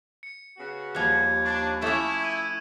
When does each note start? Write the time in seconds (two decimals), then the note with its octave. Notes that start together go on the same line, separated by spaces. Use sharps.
0.23 C#7
0.58 C#3 B3 F#4
0.95 D#2 F3 G3 F#6 G#6
1.45 D4 C#6
1.82 A3 C#4 E4 D6 D#6 E7
2.23 E6 D#7